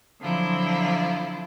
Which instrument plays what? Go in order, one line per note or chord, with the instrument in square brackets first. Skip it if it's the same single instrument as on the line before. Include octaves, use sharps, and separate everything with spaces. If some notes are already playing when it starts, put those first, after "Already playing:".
[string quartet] D3 F3 F#3 C4 E4 F4